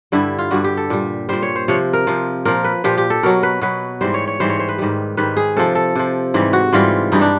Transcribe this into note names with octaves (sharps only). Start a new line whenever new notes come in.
G2 D3 G3 E4
F4
G2 D3 G3 F#4
G4
A4
A#2 G3
A#2 G3 C5
C#5
C5
C3 F3 C#5
A#4
C3 F3
A#2 F3 A#4
B4
A#2 F3 G4
G4
A4
B2 F#3 A#4
B4
B2 F#3 B4
G#2 E3 G3 C5
C#5
C#5
G#2 E3 G3 C5
C#5
C5
B4
G#2 D#3 G3
G#2 D#3 G3 B4
G#4
C3 F3 A4
A4
C3 F3
G#2 E3 G3
F#4
G#2 E3 G3 F4
G2 E3 G3 D#4
D4